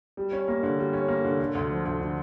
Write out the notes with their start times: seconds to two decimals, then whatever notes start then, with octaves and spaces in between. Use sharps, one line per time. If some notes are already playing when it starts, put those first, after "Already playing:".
0.17 G3
0.32 C#4
0.48 A#3
0.63 D3
0.79 G3
0.93 C#4
1.08 A#3
1.25 D3
1.40 D3
1.55 D2
1.71 F3
1.85 D2
2.01 D3